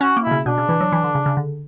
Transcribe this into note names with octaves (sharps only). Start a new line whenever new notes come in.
C#4 F#4
A#3
B2 E4
C#3
B2 D4
C#3
E3
F#3
E3
D3
C#3
C#3
D3